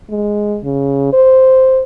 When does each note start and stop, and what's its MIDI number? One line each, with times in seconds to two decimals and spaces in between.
0.10 0.58 56
0.64 1.08 49
1.13 1.82 72